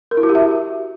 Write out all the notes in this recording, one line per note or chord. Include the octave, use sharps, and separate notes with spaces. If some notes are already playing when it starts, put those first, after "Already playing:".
A#4
E4
F#4
G4
E5